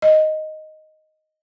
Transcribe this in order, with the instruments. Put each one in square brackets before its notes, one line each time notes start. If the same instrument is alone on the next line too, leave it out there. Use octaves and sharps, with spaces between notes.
[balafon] D#5